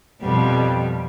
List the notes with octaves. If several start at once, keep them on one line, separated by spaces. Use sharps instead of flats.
F2 B2 G3